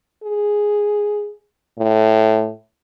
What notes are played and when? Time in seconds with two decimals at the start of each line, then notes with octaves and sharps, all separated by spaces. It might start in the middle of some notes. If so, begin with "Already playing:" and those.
0.24 G#4
1.78 A2